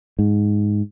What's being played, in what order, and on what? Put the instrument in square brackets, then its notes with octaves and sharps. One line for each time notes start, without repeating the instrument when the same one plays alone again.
[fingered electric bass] G#2